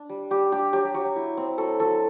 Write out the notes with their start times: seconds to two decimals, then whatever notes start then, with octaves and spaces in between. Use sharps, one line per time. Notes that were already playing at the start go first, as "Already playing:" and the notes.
Already playing: D4
0.09 G3
0.30 G3 G4
0.52 D4 G4
0.73 F#3 G4
0.94 F#3
1.16 E4
1.37 C4
1.58 F#3 A4
1.80 F#3 A4